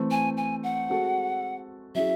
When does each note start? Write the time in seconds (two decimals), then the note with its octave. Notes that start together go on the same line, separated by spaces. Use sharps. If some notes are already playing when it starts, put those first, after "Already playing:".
Already playing: E3 A3 C4
0.11 G#5
0.37 G#5
0.64 F#5
0.90 G#3 C4 F#4 A4
1.95 F#3 C#4 E4 G#4 E5